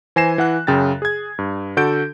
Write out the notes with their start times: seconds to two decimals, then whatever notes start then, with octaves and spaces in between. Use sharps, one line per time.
0.16 E3 C5 G#5 A#6 C7 E7
0.38 E3 F#5 F#6
0.67 F#2 C#3 G5 A6
1.02 G#4 G#6
1.39 G2
1.77 D3 F#4 A4 G6 D7